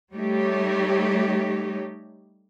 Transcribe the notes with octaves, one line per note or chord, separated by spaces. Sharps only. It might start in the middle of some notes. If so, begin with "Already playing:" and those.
G3 A3 D#4 G4 C#5